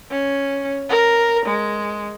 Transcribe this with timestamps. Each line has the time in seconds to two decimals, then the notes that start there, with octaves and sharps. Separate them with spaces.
0.11 C#4
0.89 A#4
1.46 G#3